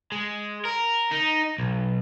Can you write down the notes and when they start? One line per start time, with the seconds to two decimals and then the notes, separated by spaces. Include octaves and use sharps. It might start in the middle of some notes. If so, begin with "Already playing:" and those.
0.12 G#3
0.65 A#4
1.11 D#4
1.58 B1